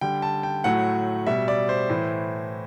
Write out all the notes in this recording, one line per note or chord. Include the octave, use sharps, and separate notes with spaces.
D3 G3 G5
A5
G5
A2 F#3 A3 F#5
B2 G3 E5
D5
C5
A2 E3 A3